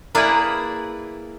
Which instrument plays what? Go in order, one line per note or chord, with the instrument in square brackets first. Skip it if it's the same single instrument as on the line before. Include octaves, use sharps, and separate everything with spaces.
[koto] A#3 E4 G#4 B4 D5